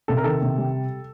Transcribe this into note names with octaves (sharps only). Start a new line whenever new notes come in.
C3 A4
A#4
D#3 A4
C3
G3